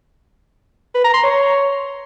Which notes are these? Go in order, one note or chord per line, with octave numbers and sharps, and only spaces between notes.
B4
A#5
C6
C#5